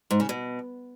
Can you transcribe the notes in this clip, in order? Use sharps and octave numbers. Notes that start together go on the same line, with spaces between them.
G#2
C#3
B2